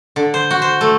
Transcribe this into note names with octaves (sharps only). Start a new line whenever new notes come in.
D3
C5
F#4
C5
A3